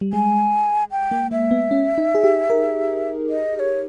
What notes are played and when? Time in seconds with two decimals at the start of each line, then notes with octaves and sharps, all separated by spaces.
0.01 G3
0.13 G#3 G#5
0.91 G5
1.11 A#3
1.31 A#3 E5
1.51 B3
1.71 C#4
1.98 D#4
2.15 G#4
2.24 G4
2.50 A#4
3.30 D#5
3.56 D#5
3.59 C#5